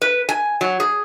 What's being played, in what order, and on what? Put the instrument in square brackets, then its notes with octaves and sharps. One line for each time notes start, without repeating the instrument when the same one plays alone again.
[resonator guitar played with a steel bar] B4
G#5
F#3
G#4